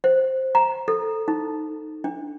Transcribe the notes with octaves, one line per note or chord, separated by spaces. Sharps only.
C5
A#5
A4
D#4
D4